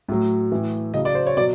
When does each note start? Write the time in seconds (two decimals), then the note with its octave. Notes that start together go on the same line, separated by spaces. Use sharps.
0.09 A2 F#3
0.52 A2 E3
0.94 C#3 F#3 D#5
1.05 D5
1.15 C5
1.27 C#5
1.37 B2 F#3 D5